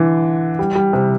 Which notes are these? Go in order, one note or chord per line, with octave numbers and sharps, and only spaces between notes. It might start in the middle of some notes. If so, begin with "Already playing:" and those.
Already playing: D3 E3
G3
G3
C3